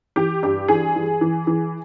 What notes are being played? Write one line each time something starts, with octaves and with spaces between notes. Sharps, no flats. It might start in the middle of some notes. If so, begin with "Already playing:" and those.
E3 G4
G2 G4
E3 G#4
E3
E3
E3